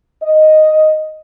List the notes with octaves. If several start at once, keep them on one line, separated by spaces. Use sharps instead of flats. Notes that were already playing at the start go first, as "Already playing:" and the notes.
D#5